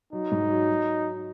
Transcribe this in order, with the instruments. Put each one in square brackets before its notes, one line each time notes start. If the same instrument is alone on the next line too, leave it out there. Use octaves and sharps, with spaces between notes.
[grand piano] F#3 [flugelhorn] D#4
[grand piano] G#2
F#3
F#3